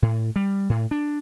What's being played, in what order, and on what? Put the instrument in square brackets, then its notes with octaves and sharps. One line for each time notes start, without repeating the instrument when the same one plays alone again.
[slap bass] A2
G3
A2
D4